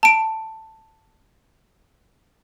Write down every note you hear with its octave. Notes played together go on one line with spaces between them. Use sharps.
A5 D7